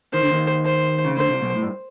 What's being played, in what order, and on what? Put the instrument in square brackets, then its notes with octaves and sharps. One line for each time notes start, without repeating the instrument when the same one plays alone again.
[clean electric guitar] D#3 [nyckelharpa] C5
[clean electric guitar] D3
D#2 D#3
[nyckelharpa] C5
[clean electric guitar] C#3
[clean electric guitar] D2 D3 [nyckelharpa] C5
[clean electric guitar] C2 C3
B1 B2
A2
G2